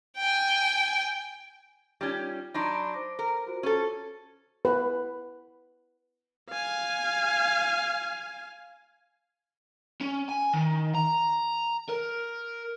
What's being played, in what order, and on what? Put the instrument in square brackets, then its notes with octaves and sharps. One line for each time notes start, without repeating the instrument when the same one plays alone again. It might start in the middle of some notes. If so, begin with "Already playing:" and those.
[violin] G5 G#5
[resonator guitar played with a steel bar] G3 C#4 [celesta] D#4 F4 G#6
[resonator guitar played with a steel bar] F#3 D4 D#4 [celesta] B5 C6 D7
[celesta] C5 D6 A#6
[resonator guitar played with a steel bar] A#4
[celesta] F4 F#4 C5
[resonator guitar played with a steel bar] C#4 A4
[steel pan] B4
[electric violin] F5 G#5
[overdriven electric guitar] C#4
G#5
D#3
A#5
A#4